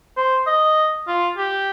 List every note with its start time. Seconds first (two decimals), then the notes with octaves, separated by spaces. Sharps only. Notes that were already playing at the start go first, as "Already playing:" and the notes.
0.17 C5
0.47 D#5
1.08 F4
1.37 G4